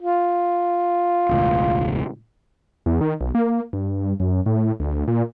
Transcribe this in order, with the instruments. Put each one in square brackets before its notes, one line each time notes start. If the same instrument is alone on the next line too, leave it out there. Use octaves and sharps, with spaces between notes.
[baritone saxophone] F4
[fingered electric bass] E1 C#2 A2
[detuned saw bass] E2
D#3
B1
A#3
G2
F#2
A2
D2
A#2